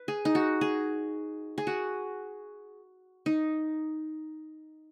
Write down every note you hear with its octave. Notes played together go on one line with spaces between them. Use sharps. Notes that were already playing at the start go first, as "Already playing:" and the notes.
Already playing: B4
G#4
D#4
F#4
G#4
G#4
F#4
D#4